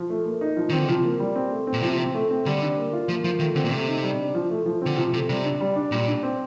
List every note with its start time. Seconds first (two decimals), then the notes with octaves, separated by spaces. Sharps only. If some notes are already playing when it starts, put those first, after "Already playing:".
Already playing: F3
0.10 A3
0.25 A#3
0.41 D#4
0.57 F3
0.70 D#3 C4
0.79 D3
0.88 C3 F3
1.04 A#3
1.20 G3
1.35 C4
1.51 A3
1.67 C4
1.73 A#2
1.82 C3 F3
1.98 C4
2.14 A3
2.30 C4
2.46 D3 G3
2.61 D4
2.77 A#3
2.93 F4
3.09 F3 A#3
3.24 F3 F4
3.39 D#3 A3
3.56 D3 C4
3.65 A#2
3.72 C3 A3
3.87 D#4
4.03 G3
4.19 D4
4.35 F3
4.50 A3
4.66 F3
4.82 D3 C4
4.97 C3 F3
5.13 C3 A3
5.29 C3 G3
5.44 D4
5.60 G3
5.76 D4
5.92 A#2 G3
6.07 D4
6.23 C4